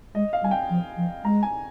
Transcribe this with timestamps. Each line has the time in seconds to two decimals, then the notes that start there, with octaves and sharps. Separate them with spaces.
0.15 G#3 D#5
0.33 F5
0.42 G3 G#5
0.51 G5
0.70 F3
0.97 F3
1.24 G#3 A#5
1.43 G#5